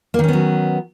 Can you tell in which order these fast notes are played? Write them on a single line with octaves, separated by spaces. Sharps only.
A#3 D#3 C#4 B3 F#3